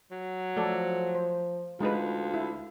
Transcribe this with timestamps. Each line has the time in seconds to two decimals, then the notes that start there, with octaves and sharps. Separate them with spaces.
0.11 F#3
0.57 F3 A3 A4 D5
1.15 C5
1.80 D2 G#3 D#4 F4 B4
2.34 E4